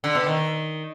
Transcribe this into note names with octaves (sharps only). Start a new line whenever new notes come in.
D3
B2
D#3